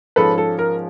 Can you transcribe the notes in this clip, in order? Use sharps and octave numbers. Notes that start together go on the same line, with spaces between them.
G#2 F3 G#3 C#4 A4 B4
A4
A#4